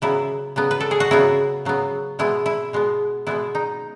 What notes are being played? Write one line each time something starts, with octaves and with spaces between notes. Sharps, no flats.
C#3 F#3 B3 E4
C#3 F#3 B3
B4
A4
G#4
F#4
C#3 F#3 B3 E4
C#3 F#3 B3
B2 G#3 B3 E4
E4
B2 G#3 B3
B2 G#3 B3 E4
D#4